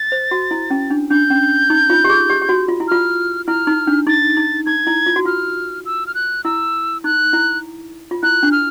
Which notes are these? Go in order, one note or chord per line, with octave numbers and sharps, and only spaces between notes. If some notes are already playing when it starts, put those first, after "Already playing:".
Already playing: A6
C5
F#4
E4
C#4
D4
D4 G6
C#4
D#4
F4
G4
G#4
G4
G4
F#4
F4
E4
F4 F6
E4 F6
D#4
D4
D#4 A6
D#4
D#4 G#6
E4
F4
F#4
F4 F6
E6
F6
F#6
E4 E6
D#4 F#6
E4
F4
E4 F#6
D4
F6